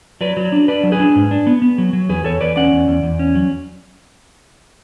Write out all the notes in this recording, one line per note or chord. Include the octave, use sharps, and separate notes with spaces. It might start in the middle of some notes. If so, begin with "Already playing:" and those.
F#3 B4 D5
F#3
D4
D4 B4 D5
F#3
G#4 B4
D4
G#2
D4
B3
B3
F#3
F#3
E2 G#4 B4
E2 A4 C#5
E2 B4 D5
C#4 D5 F#5
E2
E2
E2
C#4
F#3